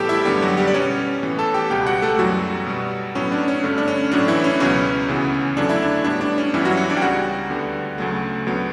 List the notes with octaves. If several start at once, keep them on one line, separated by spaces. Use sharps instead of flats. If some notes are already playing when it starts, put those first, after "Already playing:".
Already playing: A2 E3 G3 B3 G4 A4 G5 A5
E4 E5
F#2 D3 G3 B3 G4
F#3 F#4
G3 G4
D5
B2 G3 B3 C#4 C#5
A2 E3 B3
A4 A5
G4 G5
C#2 B2 G3 B3 G4 G5
F#4 F#5
A3 A4
F#2 E3 F#3 G3 F#4
B2 G3 B3
A2 F#3 B3 C#4
D4
C#4
G2 D3 A3
D4
C#4
A2 F#3 A3 D4
E3 E4
C#4
C#2 B2 F#3 B3 C#4
D2 C#3 E3 B3
E2 D3 F#3 A3 D4
E4
D4
A2 G3 B3 D4
D4
C#4
G2 E3 G3 B3 E4
F#3 F#4
C#4 C#5
D4 D5
G5
C#2 C#3 G3 F#4 F#5
D2 D3 G3 B3
D2 C#3 F#3 A3
D2 D3 F#3 B3